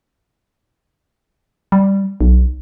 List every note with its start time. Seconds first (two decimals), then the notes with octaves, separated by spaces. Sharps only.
1.72 G3
2.21 B1